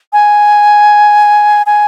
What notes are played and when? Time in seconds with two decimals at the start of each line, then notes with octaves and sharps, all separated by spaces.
0.13 G#5
1.66 G#5